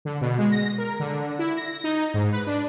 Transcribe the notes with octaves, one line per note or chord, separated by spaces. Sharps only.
D3
B2
G#3
A#6
A#4
D3
E4
A#6
D#4
G#2
B4
D4